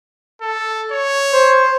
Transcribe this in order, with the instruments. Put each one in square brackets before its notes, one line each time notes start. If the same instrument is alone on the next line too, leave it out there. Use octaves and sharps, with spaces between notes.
[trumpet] A4
C#5
[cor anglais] C5